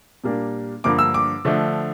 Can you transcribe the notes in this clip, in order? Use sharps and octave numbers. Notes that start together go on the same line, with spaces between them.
A#2 G3 A#3 D4
G2 D3 F3 A#3 D6
E6
D6
D3 F3 A3 D4